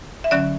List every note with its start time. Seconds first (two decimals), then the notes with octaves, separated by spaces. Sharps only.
0.24 E5
0.31 D3 F#3 C#4 D5